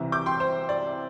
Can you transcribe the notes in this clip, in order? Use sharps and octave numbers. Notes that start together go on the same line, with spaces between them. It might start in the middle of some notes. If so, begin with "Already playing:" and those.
Already playing: C2 C3 E3
D6 G6
G5 C6
C5
D5